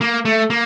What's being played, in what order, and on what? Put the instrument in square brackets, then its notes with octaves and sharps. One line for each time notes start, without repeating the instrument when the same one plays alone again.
[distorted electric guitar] A#3
A3
A#3